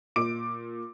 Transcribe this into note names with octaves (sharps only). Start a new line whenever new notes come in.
A#2 D6 D7